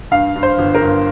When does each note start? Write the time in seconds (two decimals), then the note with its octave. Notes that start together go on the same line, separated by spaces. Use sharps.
0.11 G2 F5
0.36 G2
0.43 C5
0.58 G1
0.75 A#4
0.82 G2